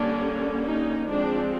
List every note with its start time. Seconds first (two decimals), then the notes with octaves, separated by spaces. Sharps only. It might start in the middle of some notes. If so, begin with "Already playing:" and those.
Already playing: D3 G3 A#3 C#4 D4
0.65 D#4
1.07 F3 G#3 C4 D4